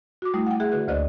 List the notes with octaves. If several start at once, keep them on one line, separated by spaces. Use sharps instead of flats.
F#4 D6
G3 A3 E4 D#6
F#5 G5
G#4 E5 F#5 F#6
D3 F#4 B4 F#6
D2 A#3 C5 D5 D#5 F#6